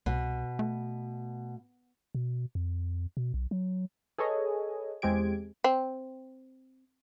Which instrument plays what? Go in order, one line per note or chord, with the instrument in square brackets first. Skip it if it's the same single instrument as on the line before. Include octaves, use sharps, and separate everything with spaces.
[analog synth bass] C2 [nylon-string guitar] B2
[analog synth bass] A3
[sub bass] B2
F2
B2
B1
F#3
[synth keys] G#4 A4 B4 C#5 D#5 G#5
E2 G#3 C4 G4 G#6 D7
[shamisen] C4